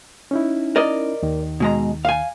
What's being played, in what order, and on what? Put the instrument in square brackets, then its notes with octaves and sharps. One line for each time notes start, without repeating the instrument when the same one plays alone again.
[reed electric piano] C#4 D#4 E4
[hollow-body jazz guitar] A#4 D5 D#5
[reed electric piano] D#2 D#3
[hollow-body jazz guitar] B2 G#3 A#5
F5 G#5